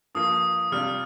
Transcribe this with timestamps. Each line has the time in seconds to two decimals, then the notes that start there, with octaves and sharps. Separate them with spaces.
0.15 G2 F3 A#3 D#6
0.72 C3 G3 D4 F4 F6